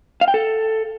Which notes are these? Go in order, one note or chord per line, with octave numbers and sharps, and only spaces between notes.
F5
G5
A4